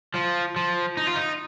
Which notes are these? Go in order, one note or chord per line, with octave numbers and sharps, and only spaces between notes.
F3
F3
D#4
F4
D#4